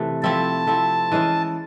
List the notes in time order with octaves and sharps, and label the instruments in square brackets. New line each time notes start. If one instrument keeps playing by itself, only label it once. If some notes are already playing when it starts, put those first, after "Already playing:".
Already playing: [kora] C3 E3 A3
[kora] F3 A3 C4 E4 [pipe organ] A5
[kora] F3 A3 C4 E4
E3 G#3 C#4 E4